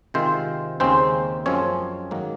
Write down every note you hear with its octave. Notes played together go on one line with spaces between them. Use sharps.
C3 D#3 G#3 C4 F4 C5
D#2 C#3 G#3 C4 C#4 C5
F#2 F3 G#3 C4 C#4 C#5
G#2 D#3 F#3 A#3